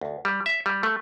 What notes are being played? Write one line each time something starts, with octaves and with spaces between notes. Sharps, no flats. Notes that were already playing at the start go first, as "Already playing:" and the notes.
D2
G3
E5
G3
A3